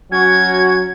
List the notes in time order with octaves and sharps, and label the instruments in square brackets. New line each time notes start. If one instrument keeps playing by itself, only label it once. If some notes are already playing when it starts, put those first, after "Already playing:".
[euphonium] F#3 [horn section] C#4 F#4 [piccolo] G#6